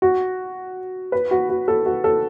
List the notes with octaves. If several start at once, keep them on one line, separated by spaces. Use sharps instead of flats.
F#4
B4
F#4
F#4
A4
F#4
A4